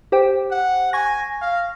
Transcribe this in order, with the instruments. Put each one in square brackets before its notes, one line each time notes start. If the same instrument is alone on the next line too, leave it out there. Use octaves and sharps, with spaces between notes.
[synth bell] G4 C5 G5
[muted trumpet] F#5
[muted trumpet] G#5 [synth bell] C#6 A#6
[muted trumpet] F5